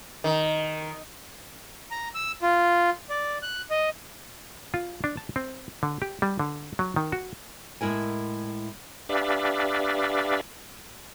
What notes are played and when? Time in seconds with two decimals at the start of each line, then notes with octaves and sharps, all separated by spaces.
0.24 D#3
1.91 A#5
2.15 E6
2.42 F4
3.10 D5
3.42 F#6
3.70 D#5
4.74 F4
5.04 D4
5.17 A5
5.36 C4
5.83 D3
6.02 G4
6.22 G3
6.39 D3
6.79 F#3
6.96 D#3
7.12 F#4
7.81 A2 G#3 E4 A#4 G#5
9.09 D4 G4 B4 D5 E5 F5